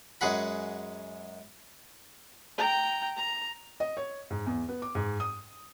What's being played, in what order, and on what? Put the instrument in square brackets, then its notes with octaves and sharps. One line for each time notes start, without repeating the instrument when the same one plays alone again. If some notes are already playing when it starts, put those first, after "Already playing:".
[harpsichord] F#2 G#3 G#4 F#5 B5
[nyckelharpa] G5 A#5
A#5
[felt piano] D#5
C#5
G#2
E2
B3
D6
G#2
D#6